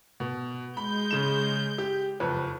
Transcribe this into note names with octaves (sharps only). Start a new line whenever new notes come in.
B2
G#3 B5 G6
C#3 E7
G4
F#1 F2 B4